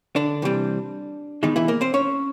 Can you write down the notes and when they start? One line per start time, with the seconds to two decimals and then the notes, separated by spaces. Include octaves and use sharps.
0.16 D3 D4
0.42 C3 E3 G3 C4
1.43 D#3 E3 G#3 B3 D#4
1.56 E3 E4
1.68 A#3 A#4
1.81 C4 C5
1.94 C#4 C#5